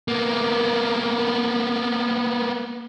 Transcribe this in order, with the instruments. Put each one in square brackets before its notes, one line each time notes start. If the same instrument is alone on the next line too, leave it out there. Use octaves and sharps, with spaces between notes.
[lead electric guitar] A#3 B3